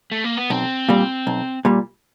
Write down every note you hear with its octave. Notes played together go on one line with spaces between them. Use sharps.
A3
A#3
B3
B1 C4
A#2 G3
B1
A#2 G3